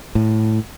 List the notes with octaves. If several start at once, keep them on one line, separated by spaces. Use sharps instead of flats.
A2